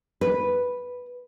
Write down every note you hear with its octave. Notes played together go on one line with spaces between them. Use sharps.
B4